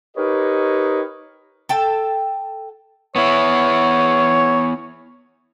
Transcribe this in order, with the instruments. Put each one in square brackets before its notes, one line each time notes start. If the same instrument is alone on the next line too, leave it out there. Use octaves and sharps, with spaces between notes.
[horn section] D#4 G4 A#4 B4 C#5 D#5
[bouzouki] A4 G5 A5
[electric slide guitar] B3 E4 [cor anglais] C#5